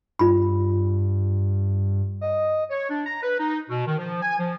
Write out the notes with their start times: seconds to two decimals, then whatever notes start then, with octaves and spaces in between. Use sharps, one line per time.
0.19 G2 F4 B5
2.21 D#5
2.70 C#5
2.90 D4
3.06 A#5
3.23 B4
3.39 D#4
3.70 B2
3.87 D#3
3.98 F3
4.22 G#5
4.39 F3